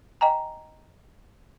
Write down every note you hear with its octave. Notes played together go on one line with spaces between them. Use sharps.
D#5 G5 G#5 A#5